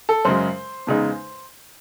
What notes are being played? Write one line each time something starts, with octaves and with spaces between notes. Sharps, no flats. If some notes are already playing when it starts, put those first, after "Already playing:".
A4
F#2 C#3 G#3 C5
E2 C#3 G#3 D#4